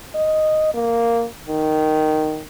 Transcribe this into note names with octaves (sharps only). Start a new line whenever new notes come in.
D#5
A#3
D#3